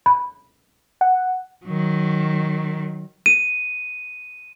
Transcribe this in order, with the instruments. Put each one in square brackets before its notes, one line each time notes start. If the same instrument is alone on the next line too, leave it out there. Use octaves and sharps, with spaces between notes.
[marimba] B5
[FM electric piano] F#5
[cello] D#3 F#3
[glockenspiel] D#7